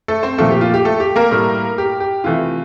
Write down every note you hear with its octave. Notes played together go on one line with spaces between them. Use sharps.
A3 A4
C4 C5
A#2 F3 A3 A#3 A4
G4
F4
G4
A3 A4
G4
A#3 A#4
A2 G3 A#3
G4
G4
C3 E3 A3 F4